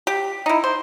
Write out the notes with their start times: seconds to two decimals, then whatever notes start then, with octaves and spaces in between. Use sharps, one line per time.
0.07 G4
0.46 D#4 E4
0.64 C5